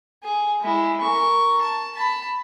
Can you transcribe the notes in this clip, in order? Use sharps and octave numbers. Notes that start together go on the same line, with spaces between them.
G#4 G#5
G#3 E4
A#4 C#6
A5
A5 B5